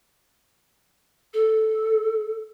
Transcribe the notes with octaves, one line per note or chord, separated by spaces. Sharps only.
A4